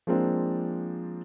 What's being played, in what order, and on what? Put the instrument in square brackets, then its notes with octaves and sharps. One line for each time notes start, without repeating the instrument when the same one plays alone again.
[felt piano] F3 G#3 A#3 C4 D4